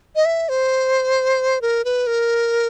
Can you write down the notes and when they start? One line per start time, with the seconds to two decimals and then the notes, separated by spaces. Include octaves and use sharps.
0.16 D#5
0.25 E5
0.49 C5
1.62 A#4
1.85 B4
2.07 A#4